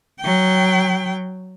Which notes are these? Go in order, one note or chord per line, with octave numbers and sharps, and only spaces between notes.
F#3 G5